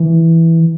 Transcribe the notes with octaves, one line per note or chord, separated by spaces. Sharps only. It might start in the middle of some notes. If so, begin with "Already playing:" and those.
Already playing: E3